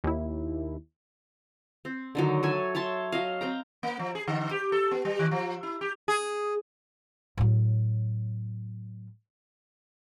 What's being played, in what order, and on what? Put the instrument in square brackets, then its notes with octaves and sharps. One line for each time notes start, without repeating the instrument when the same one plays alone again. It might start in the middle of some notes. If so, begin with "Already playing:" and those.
[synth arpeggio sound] D#2 E4
[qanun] C4
D3 D#3 F#3
A4 C#5 E5 G#5
C#5 E5 A5 C6
F#3 D#5 F5
C4 G5 A#5
[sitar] A#3
F3
G#4
D3
G4
A4
B3
G3
D#3
F3
E4
G4
G#4
[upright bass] A2 F#3